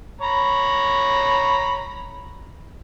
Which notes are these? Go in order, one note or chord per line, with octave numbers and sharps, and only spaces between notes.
C#5 A#5 B5